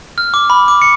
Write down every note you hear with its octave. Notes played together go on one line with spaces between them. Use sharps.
F6
D6
B5
D6
C#7